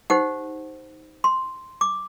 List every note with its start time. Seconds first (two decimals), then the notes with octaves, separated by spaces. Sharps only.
0.10 D#4 G4 C5 F#5
1.24 C6
1.81 D6